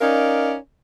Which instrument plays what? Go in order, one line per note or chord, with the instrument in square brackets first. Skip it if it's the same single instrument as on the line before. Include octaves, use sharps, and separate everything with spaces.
[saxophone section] C#4 D#4 A#4 D5 F5